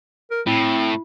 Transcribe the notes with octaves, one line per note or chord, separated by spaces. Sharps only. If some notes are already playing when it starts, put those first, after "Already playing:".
A#4
A2 C4 E4